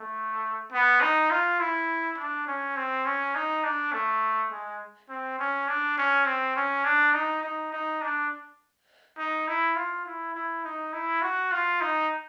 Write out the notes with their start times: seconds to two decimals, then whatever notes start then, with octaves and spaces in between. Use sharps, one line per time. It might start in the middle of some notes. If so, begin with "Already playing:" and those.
Already playing: A3
0.72 B3
1.01 D#4
1.31 F4
1.60 E4
2.17 D4
2.47 C#4
2.77 C4
3.06 C#4
3.35 D#4
3.64 D4
3.93 A3
4.51 G#3
5.09 C4
5.39 C#4
5.68 D4
5.98 C#4
6.26 C4
6.56 C#4
6.84 D4
7.14 D#4
7.43 D#4
7.73 D#4
8.02 D4
9.18 D#4
9.48 E4
9.76 F4
10.06 E4
10.34 E4
10.64 D#4
10.93 E4
11.22 F#4
11.52 F4
11.81 D#4